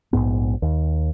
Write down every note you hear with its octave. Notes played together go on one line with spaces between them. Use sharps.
A#1 E2 G#2 B3
D#2